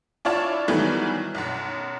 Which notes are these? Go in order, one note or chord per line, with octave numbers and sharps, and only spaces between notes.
D4 E4 F4 C#5 D5 A5
D#3 E3 F#3 G3 A3 B3
B1 F#2